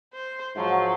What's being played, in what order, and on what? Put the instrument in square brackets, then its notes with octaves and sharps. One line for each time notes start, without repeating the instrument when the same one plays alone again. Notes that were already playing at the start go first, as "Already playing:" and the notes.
[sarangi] C5
[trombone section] G#2 F#3 [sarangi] F3